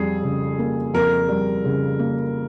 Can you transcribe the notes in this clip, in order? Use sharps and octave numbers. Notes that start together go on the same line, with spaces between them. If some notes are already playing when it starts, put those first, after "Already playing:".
Already playing: F2 G3 G#4
C#3
A#3
F2 A#4
G3
C#3
A#3